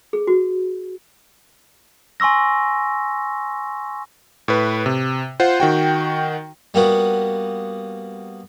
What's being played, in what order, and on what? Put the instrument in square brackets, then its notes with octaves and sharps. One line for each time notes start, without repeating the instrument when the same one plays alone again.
[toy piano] G#4
F#4
[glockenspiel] G#5 C6 C#6 E6 A#6
[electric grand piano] A2 B4
C3
F4 C5 F#5
D#3 F#4 G5
[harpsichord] G3 A#3 B3 F#4